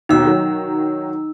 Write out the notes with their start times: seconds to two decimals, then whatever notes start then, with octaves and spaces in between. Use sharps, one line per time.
0.09 D#2 B2 D#4 E6
0.25 D#3 F#3